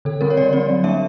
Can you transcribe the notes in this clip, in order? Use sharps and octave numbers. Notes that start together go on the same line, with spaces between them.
D3 A4
G3 C4 A#4
C#5
D3 D5
G3 C4 D5
F#3
A#3 D4 E5